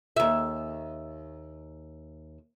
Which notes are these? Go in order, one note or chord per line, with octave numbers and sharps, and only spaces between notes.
D#2 E5